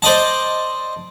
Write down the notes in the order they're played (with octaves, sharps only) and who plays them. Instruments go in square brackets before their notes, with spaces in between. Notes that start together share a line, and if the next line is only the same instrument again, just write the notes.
[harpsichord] C5 D5 D#5 A5